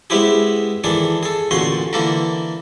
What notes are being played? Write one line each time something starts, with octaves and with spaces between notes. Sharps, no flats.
G#3 B3 C4 E4 G4 G#4
D#3 E3 D4 G#4 A4
G#4 A4
A1 A#2 D3 F#4 G#5 C6
D3 E3 A#3 A4 A#4